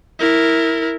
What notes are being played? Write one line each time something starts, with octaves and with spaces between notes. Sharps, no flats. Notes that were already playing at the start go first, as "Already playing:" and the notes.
E4 A#4